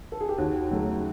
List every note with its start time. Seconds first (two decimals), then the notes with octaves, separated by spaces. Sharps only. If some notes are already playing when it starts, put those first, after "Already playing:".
0.12 A4
0.21 G#4
0.29 G4
0.38 D#2 F#4
0.71 C#3 F#3 A3